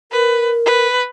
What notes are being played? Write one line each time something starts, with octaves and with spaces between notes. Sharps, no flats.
A#4 B4
B4